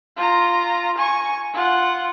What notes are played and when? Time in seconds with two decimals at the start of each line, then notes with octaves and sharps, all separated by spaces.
0.16 F4 A#5
0.97 G#5 C#6
1.53 F4 F#5